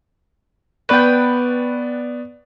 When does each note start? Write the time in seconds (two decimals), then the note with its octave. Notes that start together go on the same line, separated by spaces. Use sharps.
0.89 B3 B4 D5 G5 C#6